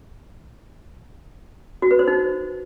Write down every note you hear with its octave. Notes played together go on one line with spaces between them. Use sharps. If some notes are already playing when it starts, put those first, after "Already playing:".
F#4
B4
C5
D#4